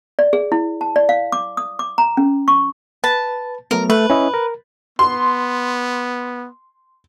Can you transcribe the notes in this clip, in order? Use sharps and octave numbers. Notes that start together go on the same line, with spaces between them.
D5
G#4
E4
A5
D5
F5
D6
D#6
D6
A#5
C#4
C#6
B4 A5
F#3 A3 B3 A#4
A3 B4
C#4 E4 D#5
A#4
B3 C6